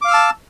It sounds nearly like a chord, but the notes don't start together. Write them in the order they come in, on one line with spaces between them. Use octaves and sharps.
D6 F5 F6 E6 A5